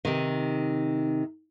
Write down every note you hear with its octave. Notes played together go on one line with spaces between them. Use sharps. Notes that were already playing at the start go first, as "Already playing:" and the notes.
C3 D#3